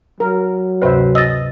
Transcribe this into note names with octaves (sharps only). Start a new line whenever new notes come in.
F#3 A#4
D2 G2 C3 B4 C5 E5
D#5 E6 A6